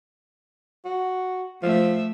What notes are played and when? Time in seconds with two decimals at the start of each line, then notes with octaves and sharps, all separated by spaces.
0.85 F#4
1.63 F3 A3 E5